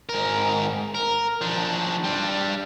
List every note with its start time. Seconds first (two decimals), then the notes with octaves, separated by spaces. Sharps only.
0.09 G#2 A#4
0.95 A#4
1.41 F3 D4
2.04 G3 D4